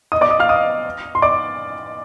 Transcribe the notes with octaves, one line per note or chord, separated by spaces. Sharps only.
D#5 D#6
D5 D6
D#5 D#6
F5 F6
D#5 D#6
C6
D5 D6